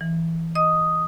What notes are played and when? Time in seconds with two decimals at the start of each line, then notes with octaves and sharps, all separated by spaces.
0.01 E3
0.55 D#5 D#6